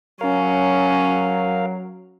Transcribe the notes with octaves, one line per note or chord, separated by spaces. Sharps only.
F#3 C#4 A#4 F5